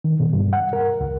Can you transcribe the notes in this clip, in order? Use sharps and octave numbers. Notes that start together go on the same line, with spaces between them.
D#3
B2
G2
F#5
A#4
C#2